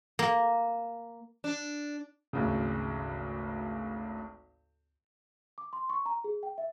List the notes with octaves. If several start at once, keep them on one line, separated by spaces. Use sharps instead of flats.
A#3
D4
G#1 D2 C#3
D6
C6
C#6
A#5
G#4
G5
E5